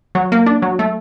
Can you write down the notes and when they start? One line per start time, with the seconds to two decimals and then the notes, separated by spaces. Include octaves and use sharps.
0.15 F#3
0.32 A#3
0.46 D4
0.62 F#3
0.79 A3